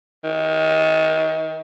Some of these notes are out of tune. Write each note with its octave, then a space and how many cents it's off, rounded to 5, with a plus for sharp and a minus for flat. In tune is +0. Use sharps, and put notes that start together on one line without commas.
D#3 +30